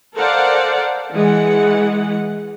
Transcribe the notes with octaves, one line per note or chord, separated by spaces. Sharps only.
A4 A#4 C5 D5 F5 F#5
E3 G#3 F#5